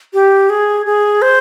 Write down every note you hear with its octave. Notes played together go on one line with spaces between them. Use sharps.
G4
G#4
G#4
C5